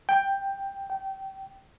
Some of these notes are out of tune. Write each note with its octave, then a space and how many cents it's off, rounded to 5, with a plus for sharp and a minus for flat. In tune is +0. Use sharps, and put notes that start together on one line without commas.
G5 +10
G5 -20